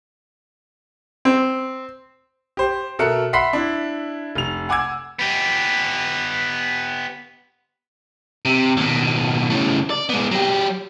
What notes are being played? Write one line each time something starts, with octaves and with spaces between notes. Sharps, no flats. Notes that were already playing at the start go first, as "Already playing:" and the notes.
C4
G4 C5
B2 A4 A#4 E5 F#6 C#7
E5 F#5 B5 C6 B6 C7
D4 E4
F1 F7
F#5 G#5 D6 E6 G#6
B3 G4
C3
D#2 B2
A2 C#3
D5
G#3 B3
F#3 G4